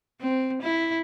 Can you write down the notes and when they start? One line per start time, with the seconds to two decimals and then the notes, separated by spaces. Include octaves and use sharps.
0.20 C4
0.62 E4